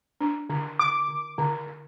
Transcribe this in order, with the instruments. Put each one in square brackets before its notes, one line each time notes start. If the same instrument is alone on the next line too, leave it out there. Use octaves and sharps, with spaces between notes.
[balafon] D4
D3
[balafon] D3 [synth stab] D6
[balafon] D3
D3
D3